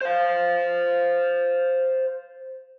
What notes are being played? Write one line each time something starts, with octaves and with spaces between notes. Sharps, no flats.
C5 F5